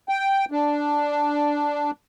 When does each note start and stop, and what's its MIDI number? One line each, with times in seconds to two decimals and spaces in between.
0.09 0.45 79
0.52 1.91 62